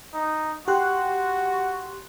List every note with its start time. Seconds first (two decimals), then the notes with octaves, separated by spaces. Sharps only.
0.14 D#4
0.68 F#4 G4 C6 F#6